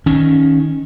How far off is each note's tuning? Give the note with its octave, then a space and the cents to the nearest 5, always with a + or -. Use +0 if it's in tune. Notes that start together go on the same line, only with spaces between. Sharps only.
D#3 +10 C#4 +0